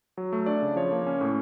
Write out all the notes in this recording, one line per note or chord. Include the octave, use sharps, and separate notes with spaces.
F#3
A3
D4 D5
C#3
F3 C#5
A#3
C#4
A2